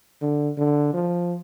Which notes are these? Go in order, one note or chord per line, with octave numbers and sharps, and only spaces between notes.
D3
D3
F3